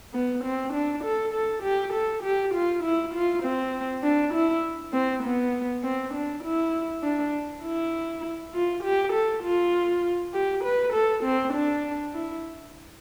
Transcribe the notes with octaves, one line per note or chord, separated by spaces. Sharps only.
B3
C4
D4
A4
A4
G4
A4
G4
F4
E4
F4
C4
D4
E4
C4
B3
C4
D4
E4
D4
E4
F4
G4
A4
F4
G4
B4
A4
C4
D4
E4